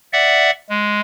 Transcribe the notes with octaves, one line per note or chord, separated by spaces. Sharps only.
D5 E5 F#5
G#3